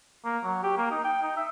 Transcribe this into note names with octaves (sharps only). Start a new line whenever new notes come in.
A#3
F#3
G4
A#3
D#4
G5
D#4
E5